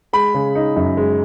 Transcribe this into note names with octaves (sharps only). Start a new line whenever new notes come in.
G#3 B5
C#3
D#4
F#2
G#3